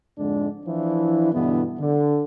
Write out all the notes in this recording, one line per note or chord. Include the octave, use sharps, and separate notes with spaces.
F2 G#2 D3 G#3 D4
E3 F3 D4 E4
G2 B2 D3 E3 B3
D3